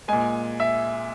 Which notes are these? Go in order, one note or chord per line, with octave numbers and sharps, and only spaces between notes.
A#2 G#3 G#5
E5